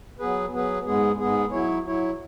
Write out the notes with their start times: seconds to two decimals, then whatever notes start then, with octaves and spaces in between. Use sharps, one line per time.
0.19 F#3 B3 G#4 B4
0.52 F#3 B3 G#4 B4
0.85 G#2 G#3 B3 G#4
1.19 G#2 G#3 B3 G#4
1.52 F#3 E4 C#5
1.85 F#3 E4 C#5